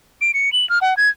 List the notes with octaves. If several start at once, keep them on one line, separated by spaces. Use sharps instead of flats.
D7
C#7
F#7
F6
F#5
G#6